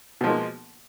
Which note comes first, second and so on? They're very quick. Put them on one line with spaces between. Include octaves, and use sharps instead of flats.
B2 F3 G#3 A#3